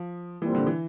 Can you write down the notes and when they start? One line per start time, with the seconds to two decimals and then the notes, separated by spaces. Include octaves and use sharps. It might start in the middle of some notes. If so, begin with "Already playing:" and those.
Already playing: F3
0.42 A#2 E3 G3 C4
0.55 D3
0.67 E3